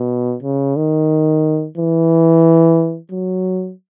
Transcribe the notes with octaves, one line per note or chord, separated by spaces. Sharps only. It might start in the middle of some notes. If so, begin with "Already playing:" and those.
Already playing: B2
C#3
D#3
E3
F#3